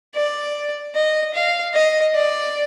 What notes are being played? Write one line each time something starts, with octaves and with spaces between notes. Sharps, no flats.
D5
D#5
F5
D#5
D5